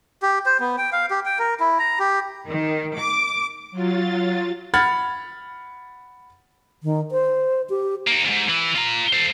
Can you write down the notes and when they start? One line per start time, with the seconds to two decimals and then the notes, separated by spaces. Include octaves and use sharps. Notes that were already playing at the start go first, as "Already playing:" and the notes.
0.22 G4
0.46 C5
0.60 B3
0.78 G5
0.92 F5
1.10 G4
1.25 G5
1.39 A#4
1.60 E4
1.79 A#5
1.99 G4
2.48 D#3
2.96 D6
3.71 F#3 F4 A6
4.74 F#5 B5 F6 G#6 A6
6.83 D#3
7.11 C5
7.70 G4
8.07 A#3 D#4
8.25 E2 G#2
8.49 E3
8.76 F4 A#5
9.13 A4 C5